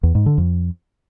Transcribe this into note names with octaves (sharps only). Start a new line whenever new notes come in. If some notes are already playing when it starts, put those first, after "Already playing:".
E2
G#2
D3
F2